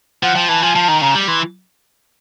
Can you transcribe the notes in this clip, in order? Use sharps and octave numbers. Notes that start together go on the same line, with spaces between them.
F3 F#5
F3 G5
E3 A5
F3 G#5
F3 A5
D#3 A#5
C#3 A#5
G3
E3 C6